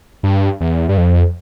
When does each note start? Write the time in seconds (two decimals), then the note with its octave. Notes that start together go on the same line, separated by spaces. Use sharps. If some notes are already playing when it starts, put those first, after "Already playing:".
0.23 G2
0.60 E2
0.89 G2
0.98 F2